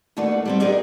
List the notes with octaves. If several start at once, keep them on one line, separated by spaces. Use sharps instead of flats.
D#2 A3 D4 F#4 A4 B4
G3 B3 C4
D4 D#4 G4 G#4 A#4